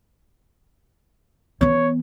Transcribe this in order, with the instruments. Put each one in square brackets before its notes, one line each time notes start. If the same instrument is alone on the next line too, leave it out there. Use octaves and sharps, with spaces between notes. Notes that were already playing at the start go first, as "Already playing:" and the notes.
[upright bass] E3 B3 [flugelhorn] C#5